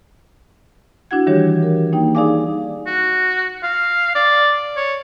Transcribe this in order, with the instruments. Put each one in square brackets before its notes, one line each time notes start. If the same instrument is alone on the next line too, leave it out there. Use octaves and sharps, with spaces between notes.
[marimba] D4 E4 F#4 F#5 G#6
D#3 E3 G3 D4 G4 C#5
A#4
A#3 D#4 G5
D#4 G#4 D5 F5 G#5 D6
[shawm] F#4
F5
D5
C#5